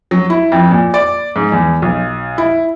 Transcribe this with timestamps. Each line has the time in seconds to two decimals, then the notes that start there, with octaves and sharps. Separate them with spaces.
0.11 F#3
0.30 E4
0.52 F2
0.71 A#2
0.94 D5
1.36 G#2
1.52 E2
1.82 B1
2.38 E4